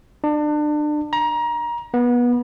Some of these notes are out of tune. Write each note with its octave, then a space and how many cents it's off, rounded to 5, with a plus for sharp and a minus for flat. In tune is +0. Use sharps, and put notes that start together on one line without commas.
D4 +30
A#5 +25
B3 -25